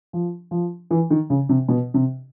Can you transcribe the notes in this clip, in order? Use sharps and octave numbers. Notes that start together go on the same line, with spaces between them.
F3
F3
E3
D#3
C#3
C3
B2
C3